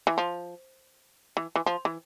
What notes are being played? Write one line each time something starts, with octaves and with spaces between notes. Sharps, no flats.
E3
F3
E3
E3
F3
E3